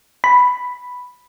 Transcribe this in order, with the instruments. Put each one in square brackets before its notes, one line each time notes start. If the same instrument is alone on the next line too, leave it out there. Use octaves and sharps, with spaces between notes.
[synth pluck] B5